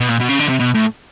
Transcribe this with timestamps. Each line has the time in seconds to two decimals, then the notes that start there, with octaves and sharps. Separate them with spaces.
0.01 B2
0.10 A#2
0.21 B2
0.30 C#3
0.40 D3
0.50 C3
0.60 B2
0.75 A2